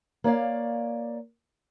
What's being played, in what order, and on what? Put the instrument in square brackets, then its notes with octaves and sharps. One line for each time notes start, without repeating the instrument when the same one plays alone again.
[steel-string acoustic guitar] A#3 C#5 D5 F5